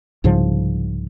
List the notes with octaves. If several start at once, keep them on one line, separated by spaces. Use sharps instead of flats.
C2 G#2 C#3 F3